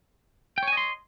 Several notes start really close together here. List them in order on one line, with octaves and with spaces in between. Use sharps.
G5 C#5 G#5 D#5 C6